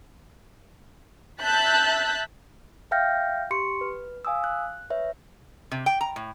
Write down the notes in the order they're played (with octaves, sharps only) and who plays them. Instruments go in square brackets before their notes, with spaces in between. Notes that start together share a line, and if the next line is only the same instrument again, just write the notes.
[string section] E5 A5 F#6 G6 A6 B6
[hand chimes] E5 F5 G5 F6 G6 A#6
G4 C6 C#6 C#7
B4
F5 G#5 D#6 E6
F#6
B4 C#5 E5
[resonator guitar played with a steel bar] C3
G5
A#5
A2